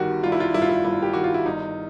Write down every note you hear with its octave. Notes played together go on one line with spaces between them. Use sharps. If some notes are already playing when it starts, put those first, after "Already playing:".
Already playing: G1 D#3 F#4 G4
G3 F4
E4
F4
G2 E4
F4
E4
G1 E4
G4
D#3 F#4
F4
E4
G1 D#4